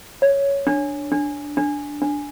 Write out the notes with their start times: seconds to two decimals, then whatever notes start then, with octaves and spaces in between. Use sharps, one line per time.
0.22 C#5
0.67 D4
1.12 D4
1.57 D4
2.02 D4